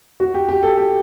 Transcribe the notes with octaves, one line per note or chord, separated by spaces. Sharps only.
F#4
G4
G4
A4
G4